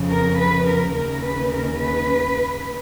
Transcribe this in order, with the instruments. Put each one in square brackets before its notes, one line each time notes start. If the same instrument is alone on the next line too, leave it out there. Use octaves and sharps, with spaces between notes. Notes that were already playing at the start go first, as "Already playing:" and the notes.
Already playing: [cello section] F2 C#3
A#4
B4
A#4
D#2 C#3 A#4
B4
A#4
B4